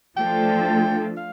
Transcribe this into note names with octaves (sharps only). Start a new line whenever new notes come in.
F3 A3 D4 F4 A4 G5
F5